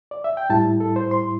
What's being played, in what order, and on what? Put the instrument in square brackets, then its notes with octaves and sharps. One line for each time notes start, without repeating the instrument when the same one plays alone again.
[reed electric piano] D5
E5
G5
A2 G3 E4 A5
A4
C5
C6